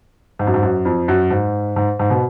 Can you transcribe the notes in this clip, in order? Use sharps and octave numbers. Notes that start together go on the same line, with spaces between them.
G#2
F#2
G#2
F#2
F2
F#2
G#2
G#2
G#2
B2